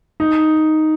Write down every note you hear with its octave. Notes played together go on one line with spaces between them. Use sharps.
D#4